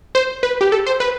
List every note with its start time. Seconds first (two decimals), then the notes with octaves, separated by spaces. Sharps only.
0.15 C5
0.43 B4
0.61 G4
0.72 A4
0.86 C5
1.00 B4